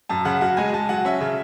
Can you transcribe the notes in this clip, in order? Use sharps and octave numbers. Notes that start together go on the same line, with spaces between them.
F#2 A5
C#3 F#5
F#3 F#5
G#3 G#5
G#3 A5
F#3 F#5
C#4 E5
C#3